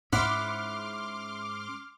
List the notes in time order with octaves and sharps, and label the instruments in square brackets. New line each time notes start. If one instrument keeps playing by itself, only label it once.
[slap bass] G#2 C#4 [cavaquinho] E4 F#5 [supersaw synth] C6 D6 F6